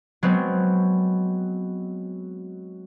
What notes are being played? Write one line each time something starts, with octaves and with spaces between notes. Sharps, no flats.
F#3 G#3 B3 C4